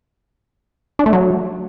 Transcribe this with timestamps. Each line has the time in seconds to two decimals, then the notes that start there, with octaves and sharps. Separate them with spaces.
0.99 D4
1.06 A3
1.13 F#3